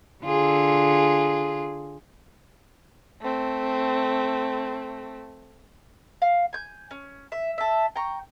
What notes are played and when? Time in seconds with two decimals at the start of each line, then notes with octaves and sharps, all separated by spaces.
0.24 D3 F4 G#4
3.22 A3 C4
6.22 F5
6.53 G#5 G6
6.91 C#4
7.32 E5
7.58 A4 E5
7.96 G5 A#5 C#6